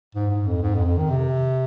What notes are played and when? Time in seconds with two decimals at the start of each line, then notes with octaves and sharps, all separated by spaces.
0.15 G#2
0.30 G#2
0.47 F2
0.62 G#2
0.75 F2
0.86 F2
0.98 D#3
1.10 C3